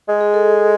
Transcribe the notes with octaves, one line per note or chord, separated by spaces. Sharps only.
G#3
G#4
A4